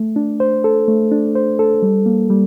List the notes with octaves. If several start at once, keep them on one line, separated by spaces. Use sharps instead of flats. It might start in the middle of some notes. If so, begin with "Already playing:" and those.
Already playing: A3
D4
C5
A4
A3
D4
C5
A4
G3
A#3
G3